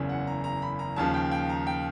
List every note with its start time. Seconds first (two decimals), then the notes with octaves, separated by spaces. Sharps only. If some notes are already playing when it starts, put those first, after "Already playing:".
Already playing: F#1 E2 C#3
0.09 F#5
0.27 A#5
0.44 A#5
0.62 B5
0.79 A#5
0.96 D#2 C#3 F3 A5
1.14 G5
1.31 G5
1.49 A#5
1.67 G5